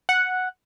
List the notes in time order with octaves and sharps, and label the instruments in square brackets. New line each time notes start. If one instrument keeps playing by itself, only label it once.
[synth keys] F#5